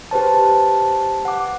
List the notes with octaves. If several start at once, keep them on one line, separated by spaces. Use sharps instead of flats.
G4 B4 C5 A5
F#5 D6